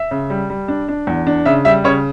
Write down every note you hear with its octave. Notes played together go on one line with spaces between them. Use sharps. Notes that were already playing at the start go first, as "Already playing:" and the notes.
Already playing: E5
C#3
G3
G3
D4
D4
E2
D4
C#3 E5
G3 E5
C#3 C#5